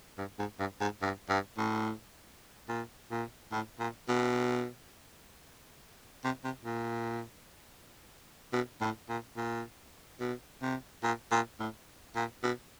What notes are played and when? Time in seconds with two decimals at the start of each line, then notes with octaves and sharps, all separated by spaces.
0.18 G2
0.39 G#2
0.59 G2
0.81 G#2
1.02 G2
1.29 G2
1.58 A2
2.69 A#2
3.11 A#2
3.52 A2
3.79 A#2
4.08 B2
6.24 C3
6.44 C3
6.65 A#2
8.53 B2
8.81 A2
9.09 A#2
9.37 A#2
10.20 B2
10.62 C3
11.04 A#2
11.32 A#2
11.60 A2
12.16 A#2
12.43 B2